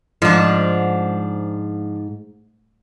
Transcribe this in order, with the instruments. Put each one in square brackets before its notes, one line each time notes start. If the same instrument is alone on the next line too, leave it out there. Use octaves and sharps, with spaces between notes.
[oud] G#2 [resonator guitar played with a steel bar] F3 D4